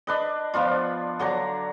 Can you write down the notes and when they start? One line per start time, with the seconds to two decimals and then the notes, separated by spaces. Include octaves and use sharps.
0.07 D4 B4 D#5
0.54 F3 B3 D4 F4
1.19 D3 F#3 D4 A#5